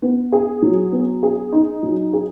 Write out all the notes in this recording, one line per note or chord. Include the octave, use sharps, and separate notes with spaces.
B3
G#4
F#3
B3
G#4
D#4
F#3
G#4